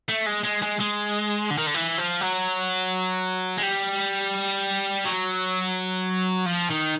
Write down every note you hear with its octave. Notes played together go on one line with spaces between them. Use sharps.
A3
G#3
G#3
G#3
G#3
D3
D#3
D3
E3
F3
F#3
G#3
G3
F#3
F3
D#3